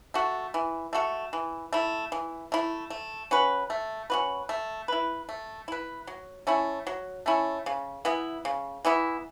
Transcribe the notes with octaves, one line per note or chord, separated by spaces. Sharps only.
A3 F#4 A4
E3
A3 F#4 A4
E3
A3 E4
E3
A3 E4
A3
C#4 F#4 B4
A3
C#4 F#4 B4
A3
E4 B4
A3
E4 B4
F#3
A3 C#4 E4
F#3
A3 C#4 E4
C#3
E3 B3 E4
C#3
E3 B3 E4